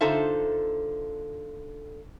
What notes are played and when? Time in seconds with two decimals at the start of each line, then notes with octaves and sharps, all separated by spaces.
0.01 D3 D#4 F4 A4 C5 E5